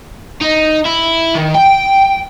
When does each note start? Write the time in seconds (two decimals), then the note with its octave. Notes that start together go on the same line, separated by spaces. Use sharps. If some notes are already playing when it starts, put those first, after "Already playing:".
0.41 D#4
0.85 E4
1.35 D#3
1.55 G5